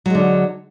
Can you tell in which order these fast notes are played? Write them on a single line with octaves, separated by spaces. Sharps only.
F#3 G#3 D3